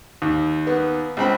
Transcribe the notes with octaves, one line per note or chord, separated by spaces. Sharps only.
D#2
B3
C#2 C4 B5